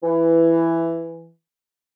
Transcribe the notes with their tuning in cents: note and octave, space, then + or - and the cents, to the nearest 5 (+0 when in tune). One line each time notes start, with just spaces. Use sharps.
E3 +10